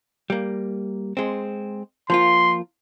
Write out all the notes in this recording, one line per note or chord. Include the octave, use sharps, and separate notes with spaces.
G3 A#3
G#3 C4
F3 A#3 F4 C6